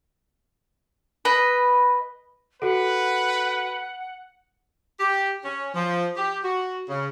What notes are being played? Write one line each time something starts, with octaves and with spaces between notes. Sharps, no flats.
B4 D#5
F#4 A4 B4 F#5
G4
C#4
F3
G4
F#4
C#3